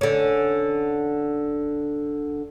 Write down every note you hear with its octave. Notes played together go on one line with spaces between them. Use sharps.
D3 C#4